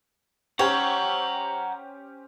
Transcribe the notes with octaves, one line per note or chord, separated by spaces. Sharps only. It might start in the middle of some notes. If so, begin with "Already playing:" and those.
C#4 G4 C5 C#5 F#5 A#5